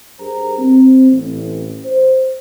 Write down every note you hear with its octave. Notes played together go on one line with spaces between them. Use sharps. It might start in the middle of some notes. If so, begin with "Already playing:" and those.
G2 G4 G#4 A#4 C5 A#5
C4
A1
C5